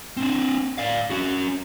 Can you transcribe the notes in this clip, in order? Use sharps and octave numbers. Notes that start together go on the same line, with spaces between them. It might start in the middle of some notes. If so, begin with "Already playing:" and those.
C4 D4
D5 F5
C#4 F#4